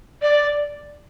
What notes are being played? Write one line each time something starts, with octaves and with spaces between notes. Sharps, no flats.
D5